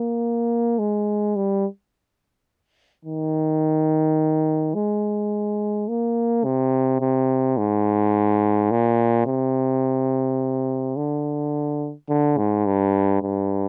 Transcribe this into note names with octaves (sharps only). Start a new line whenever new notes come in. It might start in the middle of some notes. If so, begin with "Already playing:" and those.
Already playing: A#3
G#3
G3
D#3
G#3
A#3
C3
C3
G#2
A#2
C3
D3
D3
G#2
G2
G2